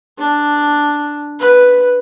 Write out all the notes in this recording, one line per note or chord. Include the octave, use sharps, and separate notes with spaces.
D4
B4